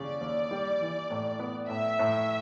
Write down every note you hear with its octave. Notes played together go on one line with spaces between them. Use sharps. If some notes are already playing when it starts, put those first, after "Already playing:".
Already playing: D#2 C#3 D5
D#2
G3
E3
A2
B3
A2 E5
A2